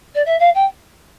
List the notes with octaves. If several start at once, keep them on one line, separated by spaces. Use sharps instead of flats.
D5
E5
F5
G5